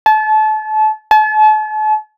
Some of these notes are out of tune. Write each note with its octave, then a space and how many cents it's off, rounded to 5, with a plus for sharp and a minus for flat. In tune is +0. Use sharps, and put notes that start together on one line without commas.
A5 -30
A5 -40